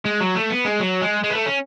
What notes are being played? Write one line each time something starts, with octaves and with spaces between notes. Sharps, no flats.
G#3
F#3
A3
B3
G#3
F#3
G#3
G#3
B3
A3
C#4